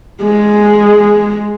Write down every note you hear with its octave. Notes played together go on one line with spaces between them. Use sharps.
G#3 G#4